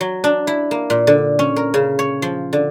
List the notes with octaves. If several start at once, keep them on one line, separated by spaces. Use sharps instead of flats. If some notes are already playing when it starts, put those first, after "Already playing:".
F#3
D4
E4
A#3
A#2
D3
C#4
A#4
C#3
C#5
F3
D3